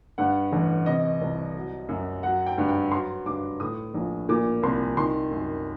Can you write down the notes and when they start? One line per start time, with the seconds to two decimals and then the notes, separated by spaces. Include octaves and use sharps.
0.18 G2 F#5
0.52 A1
0.86 C3 D#5
1.21 C2
1.56 F#3
1.89 F#2
2.23 F#3 F#5
2.46 G5
2.58 G2
2.68 G5
2.92 F#3 C6
3.26 G2 D6
3.60 A2 D#6
3.94 A#1
4.29 A#2 D6
4.63 C2 C6
4.97 D#3 C6
5.31 F#2